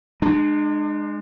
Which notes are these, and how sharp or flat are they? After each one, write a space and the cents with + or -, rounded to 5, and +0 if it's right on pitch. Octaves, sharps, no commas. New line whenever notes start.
G#3 +0 D4 +40